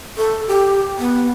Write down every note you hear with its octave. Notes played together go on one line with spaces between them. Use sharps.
A4
G4
B3